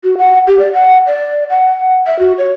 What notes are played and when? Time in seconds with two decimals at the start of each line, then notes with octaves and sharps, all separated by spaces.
0.04 F#4
0.18 F#5
0.47 G4
0.59 D5
0.73 F#5
1.06 D5
1.49 F#5
2.06 E5
2.19 F#4
2.38 C#5